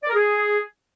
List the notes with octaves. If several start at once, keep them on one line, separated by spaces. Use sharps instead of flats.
D5
A#4
G#4